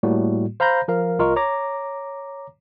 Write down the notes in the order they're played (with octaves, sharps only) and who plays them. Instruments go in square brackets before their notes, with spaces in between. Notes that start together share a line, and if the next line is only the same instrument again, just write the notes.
[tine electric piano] A2 G3 A#3 F#4
C5 F5 A#5 B5 G6 A#6
F3 A#4 F5
C2 F4 A#4 D#5 C#6
C#5 A#5 D6 A#6